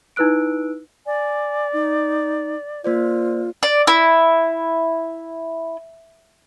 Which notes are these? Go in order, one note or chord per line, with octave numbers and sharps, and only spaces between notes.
D#4 E4 B4 E6 F#6 D7
D5 G#5
D#4
A#3 F4 C5 D5
D5
E4